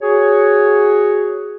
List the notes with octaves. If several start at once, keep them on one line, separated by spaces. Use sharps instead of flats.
F#4 G#4 C#5